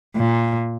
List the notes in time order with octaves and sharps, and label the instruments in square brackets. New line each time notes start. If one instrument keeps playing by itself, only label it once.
[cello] A#2